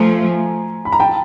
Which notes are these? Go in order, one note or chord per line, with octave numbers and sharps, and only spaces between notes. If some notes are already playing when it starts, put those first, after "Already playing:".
Already playing: F3 A3 G#5 A#5
B5
A#5
G5 A5